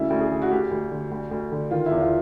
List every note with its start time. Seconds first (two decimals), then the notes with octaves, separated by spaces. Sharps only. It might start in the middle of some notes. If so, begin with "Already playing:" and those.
Already playing: D2 C#3 E4
0.10 D2
0.21 G#4
0.31 D3
0.42 F#4
0.51 D2 G4
0.71 D2
0.91 D3
1.11 D2
1.31 D2
1.52 D3
1.71 D#3 F4
1.86 E2 E4
2.01 F4